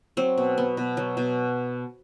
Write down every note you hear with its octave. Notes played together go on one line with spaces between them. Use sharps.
F#3 C4
B2
B3
B2
F#3
B2